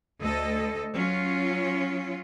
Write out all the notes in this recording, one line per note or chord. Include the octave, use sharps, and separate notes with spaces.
D2 A4 D#5
F#3 C#4 F4